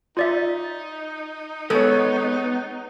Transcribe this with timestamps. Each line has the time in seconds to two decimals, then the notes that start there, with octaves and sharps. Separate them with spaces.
0.17 D#4 F4 D5 E5
1.70 G#3 B3 A4 C#5